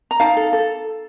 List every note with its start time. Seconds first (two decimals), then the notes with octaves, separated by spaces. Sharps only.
0.11 A#5
0.20 D#4 F5 A5
0.37 A4
0.53 A4